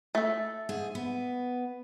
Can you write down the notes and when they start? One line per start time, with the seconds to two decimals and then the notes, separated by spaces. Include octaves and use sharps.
0.15 A3 A4
0.69 G#2 G#4 G#5
0.95 B3